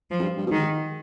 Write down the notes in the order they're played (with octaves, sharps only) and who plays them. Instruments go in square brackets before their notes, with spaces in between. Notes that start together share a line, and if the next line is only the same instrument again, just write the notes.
[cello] F3
[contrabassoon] F2
G2
G2
B2
[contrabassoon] G#2 [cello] D#3